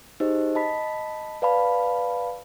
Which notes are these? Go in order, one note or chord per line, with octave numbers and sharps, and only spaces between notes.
D#4 G4 G#4 C5 D#5
D#5 A5 B5 B6
B4 D5 F5 A5 B5